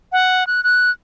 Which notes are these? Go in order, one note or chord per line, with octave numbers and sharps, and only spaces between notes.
F#5
F#6
F#6